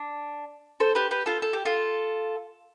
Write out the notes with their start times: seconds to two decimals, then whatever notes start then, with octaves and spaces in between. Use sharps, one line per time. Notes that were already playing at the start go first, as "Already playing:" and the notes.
Already playing: D4
0.80 A4 C5
0.95 G4 B4
1.11 G4 B4
1.26 F4 A4
1.42 A4
1.53 G4
1.65 F4 A4